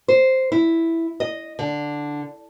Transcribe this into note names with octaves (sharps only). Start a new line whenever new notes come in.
C5
E4
D#5
D3